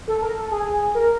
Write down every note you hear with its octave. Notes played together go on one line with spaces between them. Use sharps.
A4
A#4
A4
G#4
A#4